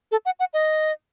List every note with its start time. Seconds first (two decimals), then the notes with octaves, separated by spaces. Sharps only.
0.12 A4
0.25 F#5
0.40 F#5
0.54 D#5